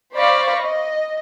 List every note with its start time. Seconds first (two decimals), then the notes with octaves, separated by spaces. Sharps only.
0.14 C5 D5 F5 B5 C#6 A#6
0.60 D#5